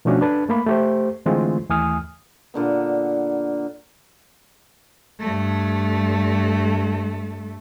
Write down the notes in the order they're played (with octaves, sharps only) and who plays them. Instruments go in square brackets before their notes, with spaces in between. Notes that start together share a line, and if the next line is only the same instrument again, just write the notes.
[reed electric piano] B2 F3 A3 C#4 D4 F#4
D4 A4 B4 A5
A3 A#3 B5
A3 G4 C5
D3 E3 G#3 A3 C4 F4
D#2 E3 A3 G#5 D#6 F6
[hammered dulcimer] A#2 D3 B3
[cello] G2 A3